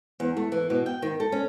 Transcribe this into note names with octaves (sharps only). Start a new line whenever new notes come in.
E2
A3
E3
B2
G5
D#3
A4
C#4